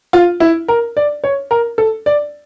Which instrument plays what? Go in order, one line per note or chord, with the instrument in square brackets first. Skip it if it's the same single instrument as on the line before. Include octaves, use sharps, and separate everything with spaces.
[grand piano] F4
E4
A#4
D5
C#5
A#4
A4
D5